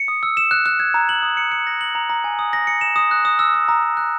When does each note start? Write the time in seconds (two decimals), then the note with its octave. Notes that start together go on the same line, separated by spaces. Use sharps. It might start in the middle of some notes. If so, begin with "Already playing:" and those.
Already playing: C#7
0.08 D#6
0.23 E6
0.37 E7
0.51 F#6
0.66 F#6
0.80 G#6
0.94 A#5
1.09 F#7
1.23 D#6
1.37 C#7
1.52 C#7
1.67 A#6
1.81 F#7
1.95 A#5
2.10 A#5
2.24 G#5
2.39 D#6
2.53 A#6
2.67 C#7
2.81 E7
2.96 D#6
3.11 F#6
3.25 D#6
3.39 E6
3.54 E6
3.69 A#5
3.83 D#6
3.97 F#6